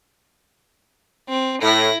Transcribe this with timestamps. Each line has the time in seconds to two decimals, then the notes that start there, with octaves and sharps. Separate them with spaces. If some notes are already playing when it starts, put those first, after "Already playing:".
1.29 C4
1.62 A2 E4 A#6